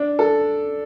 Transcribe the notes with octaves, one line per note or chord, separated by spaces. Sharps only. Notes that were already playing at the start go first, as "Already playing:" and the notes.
Already playing: D4
A4